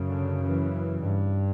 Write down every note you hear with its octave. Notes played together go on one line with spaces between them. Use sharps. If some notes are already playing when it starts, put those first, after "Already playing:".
Already playing: F#2 C#3
D3
E3
G2